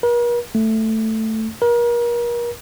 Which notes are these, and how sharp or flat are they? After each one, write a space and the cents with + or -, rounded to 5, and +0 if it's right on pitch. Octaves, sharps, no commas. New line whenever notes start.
A#4 +45
A3 +5
A#4 +35